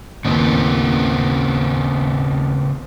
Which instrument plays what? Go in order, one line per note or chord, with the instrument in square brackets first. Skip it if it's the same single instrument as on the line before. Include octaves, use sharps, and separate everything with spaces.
[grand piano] A1 D#2 [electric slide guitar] C#3 B3 C4